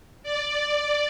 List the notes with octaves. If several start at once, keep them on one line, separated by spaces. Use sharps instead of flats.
D5